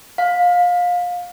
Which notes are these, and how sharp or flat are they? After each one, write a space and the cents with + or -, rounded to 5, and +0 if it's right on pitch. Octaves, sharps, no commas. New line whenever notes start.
F5 +25